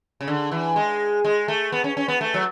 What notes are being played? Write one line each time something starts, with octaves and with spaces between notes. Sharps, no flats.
C#3
D3
E3
G#3
G#3
A3
B3
C#4
C#4
B3
A3
F#3